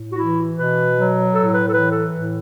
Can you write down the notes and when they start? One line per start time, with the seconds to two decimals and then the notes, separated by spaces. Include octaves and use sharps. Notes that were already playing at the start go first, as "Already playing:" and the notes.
Already playing: A2
0.13 F#4
0.18 E3 E4
0.57 B2 B4
0.96 F#3
1.34 A2 A4
1.54 B4
1.69 A4
1.73 E3 B4
1.92 A4
2.13 A2